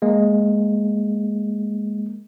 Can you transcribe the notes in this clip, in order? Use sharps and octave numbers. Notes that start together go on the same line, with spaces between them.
G#3 A#3